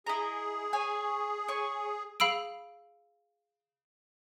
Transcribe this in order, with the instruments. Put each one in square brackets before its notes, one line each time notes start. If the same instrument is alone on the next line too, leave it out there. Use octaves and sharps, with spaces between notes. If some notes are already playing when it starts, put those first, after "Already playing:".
[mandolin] E4 D#5 A#5 [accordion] G#4
[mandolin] C#5 G#5
C#5 G#5 C#6
[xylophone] G#4 F5 B5 E6 D7